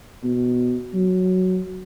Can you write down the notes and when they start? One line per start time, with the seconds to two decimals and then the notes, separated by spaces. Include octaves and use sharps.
0.24 B2
0.94 F#3